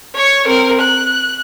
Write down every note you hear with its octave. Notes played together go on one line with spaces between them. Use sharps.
C#5 C#6
C4 A#4
F#6